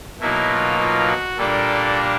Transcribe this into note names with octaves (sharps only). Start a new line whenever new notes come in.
B2 F#3 A#3 D#4 E4
F4
F4
F#4
A#2 G3 A#3 D4 A4